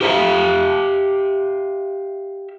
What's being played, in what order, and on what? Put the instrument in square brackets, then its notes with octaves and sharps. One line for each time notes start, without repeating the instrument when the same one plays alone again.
[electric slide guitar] G4 A#4 C5 E5 F5